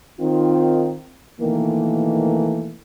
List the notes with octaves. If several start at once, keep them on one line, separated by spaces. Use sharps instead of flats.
D#3 C4 F4
B2 D#3 E3 A3 A#3